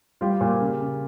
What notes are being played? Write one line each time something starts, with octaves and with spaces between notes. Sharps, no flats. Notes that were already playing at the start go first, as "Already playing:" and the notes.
G3 F4 G4
A#2
C#3
C#3